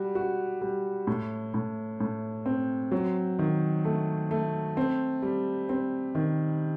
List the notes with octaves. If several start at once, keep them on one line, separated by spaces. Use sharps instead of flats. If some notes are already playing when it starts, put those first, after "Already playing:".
Already playing: G3 F#4
F#4
G3
A2
A2
A2
C4
F#3
D#3
A3
A3
C4
G3
C4
D#3